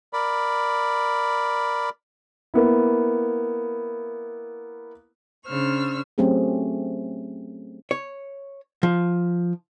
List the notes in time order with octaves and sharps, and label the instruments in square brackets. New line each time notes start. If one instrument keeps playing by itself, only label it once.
[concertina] A#4 D5 B5
[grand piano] A#3 B3 E4
[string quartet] C#3 D4 C5 C#6 E6 F6
[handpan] F#3 A3 C4 C#4 G4 G#4
[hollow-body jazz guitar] C#5
F3